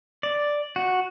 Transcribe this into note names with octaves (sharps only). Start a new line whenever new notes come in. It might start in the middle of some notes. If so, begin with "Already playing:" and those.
D5
F#4